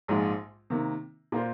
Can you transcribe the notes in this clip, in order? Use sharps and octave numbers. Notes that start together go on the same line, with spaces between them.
A#1 G#2 F3 G#3 F4
C3 D#3 A#3
A#2 A#3 F4 C5